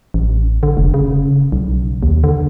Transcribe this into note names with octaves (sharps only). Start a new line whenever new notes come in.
A1
D3
F1
C#3
B1
D#2
D3